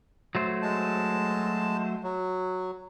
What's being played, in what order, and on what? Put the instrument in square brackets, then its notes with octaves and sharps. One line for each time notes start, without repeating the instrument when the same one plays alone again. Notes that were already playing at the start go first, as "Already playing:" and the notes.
[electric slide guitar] F#3 A3 C5
[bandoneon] G#3 A5
F#3